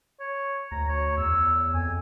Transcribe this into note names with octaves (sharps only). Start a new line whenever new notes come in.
C#5
D2 A#5
C#5
E2 E6
F2 G#5